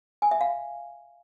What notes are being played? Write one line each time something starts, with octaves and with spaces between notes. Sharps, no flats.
G#5
E5
F5